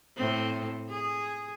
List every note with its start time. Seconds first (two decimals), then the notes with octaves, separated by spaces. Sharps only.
0.16 A2 C4
0.89 G#4